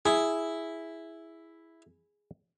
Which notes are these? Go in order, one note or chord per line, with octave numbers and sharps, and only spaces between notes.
E4 G#4